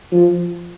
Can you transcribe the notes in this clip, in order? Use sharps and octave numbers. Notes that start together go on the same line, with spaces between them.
F3